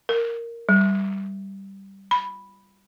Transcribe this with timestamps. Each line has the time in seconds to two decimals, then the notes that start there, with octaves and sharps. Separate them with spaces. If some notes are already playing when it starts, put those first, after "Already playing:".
0.09 A#4
0.69 G3
2.11 B5